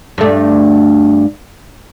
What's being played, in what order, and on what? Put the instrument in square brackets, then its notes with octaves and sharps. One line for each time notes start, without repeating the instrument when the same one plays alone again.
[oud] G2 A3